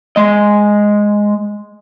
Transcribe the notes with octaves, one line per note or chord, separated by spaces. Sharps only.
G#3 D#5